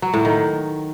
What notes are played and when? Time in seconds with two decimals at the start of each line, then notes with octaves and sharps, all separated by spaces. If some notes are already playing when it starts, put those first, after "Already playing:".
0.02 F#3
0.14 A2
0.25 D#3